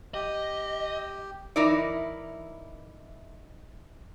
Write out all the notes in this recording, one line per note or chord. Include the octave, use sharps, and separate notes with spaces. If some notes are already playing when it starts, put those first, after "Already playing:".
G4 D#5
E3 D#4 E4 A#4 D5